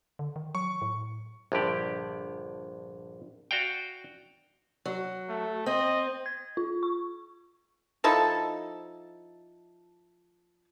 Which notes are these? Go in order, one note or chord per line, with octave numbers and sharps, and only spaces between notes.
D3
D#3
F#3 C#6
A2
A#1 G2 D3 G4 D5
F#4 D5 F5 G5
F#3
A3
C4 D#5
G#6
F4
C#6
F3 D#4 E4 A4